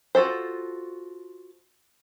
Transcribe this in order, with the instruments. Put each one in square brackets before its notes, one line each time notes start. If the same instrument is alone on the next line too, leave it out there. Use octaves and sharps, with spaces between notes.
[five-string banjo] F4 F#4 A4 C5